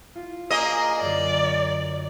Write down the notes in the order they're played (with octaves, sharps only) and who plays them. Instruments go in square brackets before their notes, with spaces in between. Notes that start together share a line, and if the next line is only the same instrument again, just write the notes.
[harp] F4
[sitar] A#3 D#5 [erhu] G#4
[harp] F#2 D3 [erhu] D5